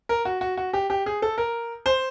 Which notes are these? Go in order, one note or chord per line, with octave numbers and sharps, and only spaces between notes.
A#4
F#4
F#4
F#4
G4
G4
G#4
A4
A#4
C5